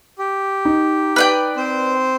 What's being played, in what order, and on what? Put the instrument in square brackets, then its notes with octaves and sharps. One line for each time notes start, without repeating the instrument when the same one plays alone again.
[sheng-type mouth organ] G4
[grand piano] D#4
[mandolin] B4 D5 G5
[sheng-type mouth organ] C4 C5